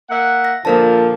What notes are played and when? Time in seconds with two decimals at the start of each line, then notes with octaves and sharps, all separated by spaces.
0.10 A#3 E5 F#5
0.45 A#6
0.65 A#2 D3 F3 A#3 A#4 A5